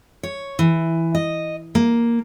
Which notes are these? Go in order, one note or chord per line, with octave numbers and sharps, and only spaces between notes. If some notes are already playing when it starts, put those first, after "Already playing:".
C#5
E3
D#5
A#3